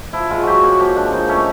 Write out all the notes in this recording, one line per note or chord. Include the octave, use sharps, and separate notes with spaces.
F3 E4
G#3 F4
F#3 F#4 G4
A#3 G#4
F#4
F3 G4
G#3 D4
F3 D#4
A3 C#4